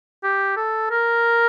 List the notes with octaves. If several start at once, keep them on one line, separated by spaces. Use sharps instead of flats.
G4
A4
A#4